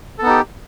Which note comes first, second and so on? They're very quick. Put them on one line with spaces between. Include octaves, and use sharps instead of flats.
A4 B3 D#4 G4